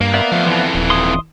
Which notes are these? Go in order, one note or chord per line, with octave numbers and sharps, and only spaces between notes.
G2 A#3
B3 D5 E5
F3 A3 F5
F2 E3
D#1
C6 D#6